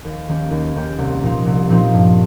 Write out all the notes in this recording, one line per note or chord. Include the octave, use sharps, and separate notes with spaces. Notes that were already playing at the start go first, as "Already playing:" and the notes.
D#2
D#3 A#3 C#4 G4
D#2
D#3 A#3 C#4 G4
C2
A#2 F3 C4 D#4
C2
A#2 F3 C4 D#4
G2